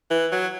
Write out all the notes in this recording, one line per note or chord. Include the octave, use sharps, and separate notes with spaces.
E3
F#3